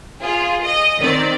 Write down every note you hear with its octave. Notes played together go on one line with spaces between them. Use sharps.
F4 G#4
D#5
D#3 C4 D5